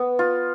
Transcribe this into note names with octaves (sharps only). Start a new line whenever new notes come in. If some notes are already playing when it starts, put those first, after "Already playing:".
Already playing: B3
F4